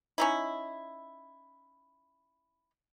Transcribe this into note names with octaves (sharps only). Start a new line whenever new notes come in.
C#4 D#4 E4